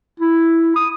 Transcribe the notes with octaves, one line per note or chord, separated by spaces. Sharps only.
E4
D#6